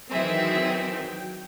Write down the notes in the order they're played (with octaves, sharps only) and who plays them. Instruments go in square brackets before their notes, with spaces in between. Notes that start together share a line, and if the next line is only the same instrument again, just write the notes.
[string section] D#3 E3 C4 [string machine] F#3 G5 [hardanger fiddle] G#4 E5